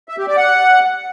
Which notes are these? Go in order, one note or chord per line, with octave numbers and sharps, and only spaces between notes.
E5
G4
D5
F#5